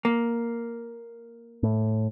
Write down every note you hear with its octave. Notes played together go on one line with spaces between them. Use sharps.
A#3
A2